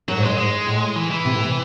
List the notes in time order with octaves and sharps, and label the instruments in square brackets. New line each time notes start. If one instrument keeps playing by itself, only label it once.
[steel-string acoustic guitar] F#2 [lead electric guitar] F#3
[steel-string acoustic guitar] G#2
[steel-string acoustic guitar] F#2 [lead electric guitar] G#3
[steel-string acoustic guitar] G#2 [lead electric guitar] G#3
[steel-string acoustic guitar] A2
[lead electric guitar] E3
E3
[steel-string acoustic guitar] C3
A2
C3